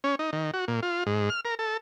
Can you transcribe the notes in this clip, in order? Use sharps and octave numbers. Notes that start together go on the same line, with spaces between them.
C#4
D#4
D#3
F#4
A#2
F4
G#2
F6
A#4
A4